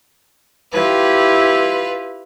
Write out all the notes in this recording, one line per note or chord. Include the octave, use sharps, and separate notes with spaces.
E4 F4 G4 B4